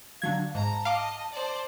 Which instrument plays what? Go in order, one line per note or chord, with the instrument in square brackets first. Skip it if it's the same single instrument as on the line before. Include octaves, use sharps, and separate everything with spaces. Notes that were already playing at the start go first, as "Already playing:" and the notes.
[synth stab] D3 F#3 G#6 [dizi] F5
[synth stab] G#2 [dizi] A5 [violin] A#5
[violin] D#5 [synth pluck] F5 D6
[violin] C5 D5